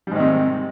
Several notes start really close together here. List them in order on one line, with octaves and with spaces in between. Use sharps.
G3 G#2 D#3 C3